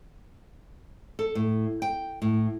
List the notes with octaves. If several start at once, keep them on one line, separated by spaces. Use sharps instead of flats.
A4
A2
G5
A2